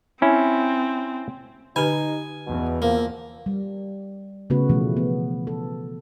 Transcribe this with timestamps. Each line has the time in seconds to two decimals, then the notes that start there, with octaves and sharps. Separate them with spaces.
0.22 C4 C#4 E4
1.76 D3 D#4 G4 B4 G#5
2.47 E2 B2
2.82 F3 A#3
3.46 G3
4.50 C#3 A3 B3 F#4 B4
4.69 B2 E3 F3 A3
4.97 B3
5.47 A4